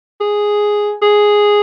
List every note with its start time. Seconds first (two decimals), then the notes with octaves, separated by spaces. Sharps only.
0.21 G#4
1.02 G#4